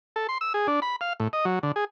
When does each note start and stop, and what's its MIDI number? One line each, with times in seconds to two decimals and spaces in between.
0.16 0.27 69
0.29 0.38 84
0.41 0.53 88
0.54 0.67 68
0.67 0.80 62
0.82 0.96 83
1.01 1.13 77
1.20 1.28 45
1.33 1.45 75
1.45 1.59 54
1.63 1.72 50
1.76 1.85 68